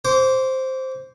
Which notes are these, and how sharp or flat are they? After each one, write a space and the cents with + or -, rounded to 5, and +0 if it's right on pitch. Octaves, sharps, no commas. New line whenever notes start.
C5 +0 D6 -35